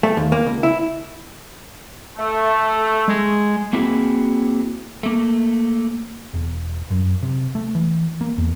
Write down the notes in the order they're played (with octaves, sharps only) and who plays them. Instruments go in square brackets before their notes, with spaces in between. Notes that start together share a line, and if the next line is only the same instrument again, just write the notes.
[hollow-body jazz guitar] A3
D#2
A#3
C#2
E4
[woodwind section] A3
[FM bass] G#3
[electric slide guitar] A#3 C4 E4 F#4 G#4
A3 A#3
[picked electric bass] E1
F#2
C3
A3
E3
A#3
E2